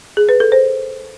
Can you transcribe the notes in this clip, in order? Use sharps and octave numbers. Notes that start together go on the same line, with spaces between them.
G#4
B4
A4
C5